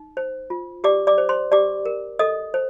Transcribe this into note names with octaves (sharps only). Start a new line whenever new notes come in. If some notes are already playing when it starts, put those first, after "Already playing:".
Already playing: D#4
C5
F4
G4 D5 D6
D5 D6
C5
C5 C6
G4 D5 D6
A#4
A4 D#5 D#6
C5